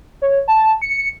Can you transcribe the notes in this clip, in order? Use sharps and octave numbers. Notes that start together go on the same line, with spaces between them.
C#5
A5
C#7